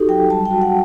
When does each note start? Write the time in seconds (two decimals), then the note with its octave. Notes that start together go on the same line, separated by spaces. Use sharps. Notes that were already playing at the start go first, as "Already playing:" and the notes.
Already playing: D#4 F#4 G4 A4
0.09 F#3 G5
0.30 G3 A5
0.45 G5
0.51 F#4
0.62 F#5